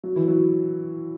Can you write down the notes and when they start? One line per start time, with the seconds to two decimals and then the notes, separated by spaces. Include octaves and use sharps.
0.04 F#3
0.16 E3
0.28 F#3